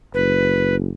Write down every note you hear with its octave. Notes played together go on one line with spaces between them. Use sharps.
F#1 B4